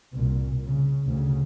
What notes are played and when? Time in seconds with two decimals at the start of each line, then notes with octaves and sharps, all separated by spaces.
0.13 C2 A#2
0.64 C#3
1.06 D2 C#3